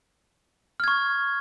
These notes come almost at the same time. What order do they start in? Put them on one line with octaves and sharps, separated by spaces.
F6 G#6 C#6